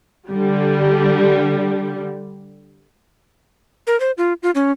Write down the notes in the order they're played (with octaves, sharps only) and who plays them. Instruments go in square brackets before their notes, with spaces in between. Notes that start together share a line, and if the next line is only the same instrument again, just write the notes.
[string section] D3 G3
[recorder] A#4
C5
F4
F4
C#4